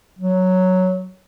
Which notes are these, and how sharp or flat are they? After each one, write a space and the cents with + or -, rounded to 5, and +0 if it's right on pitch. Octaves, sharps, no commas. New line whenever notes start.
F#3 +0